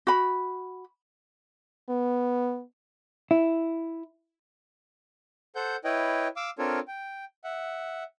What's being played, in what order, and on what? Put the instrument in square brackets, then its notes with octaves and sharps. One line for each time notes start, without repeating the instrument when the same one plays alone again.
[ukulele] F#4 B5
[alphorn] B3
[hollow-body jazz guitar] E4
[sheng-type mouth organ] A4 C5 F#5 G6
E4 B4 C#5 D#5 G5
F5 D6 E6
C4 D4 F4 A4 A#4 C#5
G5
E5 F#5